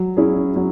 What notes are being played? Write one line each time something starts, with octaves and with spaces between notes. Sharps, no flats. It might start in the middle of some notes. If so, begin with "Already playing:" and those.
Already playing: F#3
C#4 E4 G#4
F#3